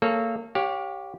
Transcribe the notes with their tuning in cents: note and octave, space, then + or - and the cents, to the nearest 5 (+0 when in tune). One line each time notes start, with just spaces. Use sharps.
A#3 -25 A4 -20 C#5 +0
G4 +0 C#5 +0 F5 +40